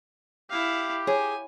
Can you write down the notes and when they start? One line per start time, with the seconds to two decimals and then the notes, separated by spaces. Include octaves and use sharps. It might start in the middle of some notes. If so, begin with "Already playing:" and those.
0.50 E4 G4 F5
1.07 G#4 C#5 G#5